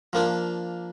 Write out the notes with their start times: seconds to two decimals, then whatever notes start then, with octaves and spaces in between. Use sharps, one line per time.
0.13 F3 A#3 D4